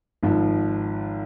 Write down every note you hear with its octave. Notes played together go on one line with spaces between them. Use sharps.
G#1 G#2 F3